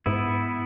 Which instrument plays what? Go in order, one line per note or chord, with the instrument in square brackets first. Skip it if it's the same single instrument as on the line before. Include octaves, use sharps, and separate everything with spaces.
[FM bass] G#2 [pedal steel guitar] B3 E4